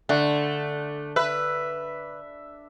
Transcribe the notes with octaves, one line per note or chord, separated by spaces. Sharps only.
D3 A3 D4
B4 E5